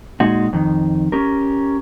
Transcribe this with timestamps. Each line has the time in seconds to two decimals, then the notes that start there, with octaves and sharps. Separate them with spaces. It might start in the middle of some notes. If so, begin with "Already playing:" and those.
0.20 A#2 G#3 D#4 F#4
0.53 F2 D#3
1.12 C#4 G4 A#4